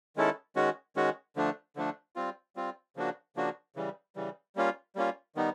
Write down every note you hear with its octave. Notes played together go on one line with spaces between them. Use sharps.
D#3 G#3 C#4 E4 A4
D#3 G#3 C#4 F#4
D#3 G#3 C#4 F#4
D3 F3 A3 D4
D3 F3 A3 D4
G3 C4 F4
G3 C4 F4
C#3 F3 A#3 D4 F#4
C#3 F3 A#3 D4 F#4
C#3 E3 G3
C#3 E3 G3
G3 A#3 C#4 F4
G3 A#3 C#4 F4
D#3 G3 B3 D#4